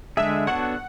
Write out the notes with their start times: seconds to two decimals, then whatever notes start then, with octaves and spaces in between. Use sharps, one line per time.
0.17 D3 G#3 D4 G#4 E5
0.47 B3 D4 F#4 A4 C#5 F#5